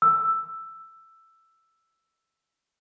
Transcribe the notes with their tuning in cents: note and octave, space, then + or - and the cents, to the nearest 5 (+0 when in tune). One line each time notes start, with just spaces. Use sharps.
E6 +5